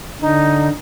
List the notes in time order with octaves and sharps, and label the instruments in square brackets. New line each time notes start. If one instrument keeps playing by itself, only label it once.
[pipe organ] D3 [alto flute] D#4